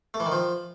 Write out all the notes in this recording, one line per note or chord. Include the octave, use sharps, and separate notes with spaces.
A3
E3
D#3
F3